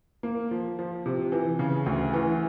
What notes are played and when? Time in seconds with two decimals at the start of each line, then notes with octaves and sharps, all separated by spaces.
0.23 A#3
0.51 F3
0.79 F3
1.06 C3
1.32 E3
1.59 C#3
1.86 D2
2.13 E3